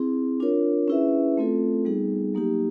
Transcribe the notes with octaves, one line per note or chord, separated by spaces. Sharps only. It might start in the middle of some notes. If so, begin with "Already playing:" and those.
Already playing: C4 E4 G#4
D4 F4 A#4 C#5
C#4 E4 G#4 B4 E5
A3 C4 F4 A4
G3 B3 D#4 G#4
F#3 A#3 D#4 G4